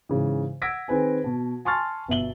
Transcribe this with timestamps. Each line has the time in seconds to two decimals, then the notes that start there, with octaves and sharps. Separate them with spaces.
0.09 G#2 C#3 E3
0.62 F#5 E6 G#6 A#6 B6 D7
0.88 D#3 C4 G#4 B4 G#5
1.24 B2 A5
1.65 G#5 A5 C6 C#6 F6 A6
2.08 G1 B2 E5 F#7 G7